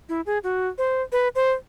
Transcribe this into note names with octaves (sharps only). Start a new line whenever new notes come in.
E4
G#4
F#4
C5
B4
C5